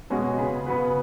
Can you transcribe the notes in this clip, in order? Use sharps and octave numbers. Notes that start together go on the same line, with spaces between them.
B2 G#3 C#4 F#4
C#3 B3 G#4 B4
C#3 B3 F#4 B4